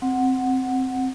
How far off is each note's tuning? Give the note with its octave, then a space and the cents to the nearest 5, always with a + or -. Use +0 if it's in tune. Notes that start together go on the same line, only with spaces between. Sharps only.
C4 +0 F#5 +0